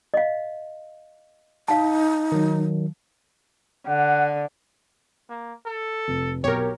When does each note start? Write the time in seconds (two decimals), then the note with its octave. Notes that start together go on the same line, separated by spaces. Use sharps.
0.14 D#5 F5
1.68 D#4 F5 A5
2.32 D#3 F#3
3.87 D3 F#5
5.29 A#3
5.66 A4
6.08 F1
6.44 B1 G4 A#4 C#5